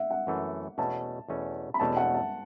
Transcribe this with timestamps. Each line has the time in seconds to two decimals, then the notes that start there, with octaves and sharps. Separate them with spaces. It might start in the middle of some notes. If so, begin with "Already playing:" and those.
Already playing: E5 F#5
0.11 F#5
0.27 F#2 E3 A3
0.78 E2 B2 A3 C#4 A5
1.29 E2 B2 A3 C#4
1.74 B5
1.80 E2 B2 A3 C#4 A5
1.97 F#5
2.14 A5